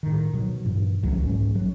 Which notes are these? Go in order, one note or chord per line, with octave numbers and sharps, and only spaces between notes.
A2 D#3
B2 F#3
G2 A#2 E3
C#2 E3 F#3 A3
A#1 G#2 C#4
F#3